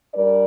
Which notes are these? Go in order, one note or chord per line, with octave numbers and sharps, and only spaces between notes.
G3 D4 A#4 D5